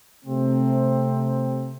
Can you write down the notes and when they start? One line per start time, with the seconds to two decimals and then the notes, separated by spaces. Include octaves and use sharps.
0.23 C3 A3 C4